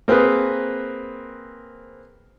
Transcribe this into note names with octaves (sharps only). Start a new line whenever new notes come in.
A#3 C4 G#4 A#4 B4